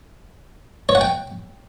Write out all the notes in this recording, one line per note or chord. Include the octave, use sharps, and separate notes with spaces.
C#5
F#5
G5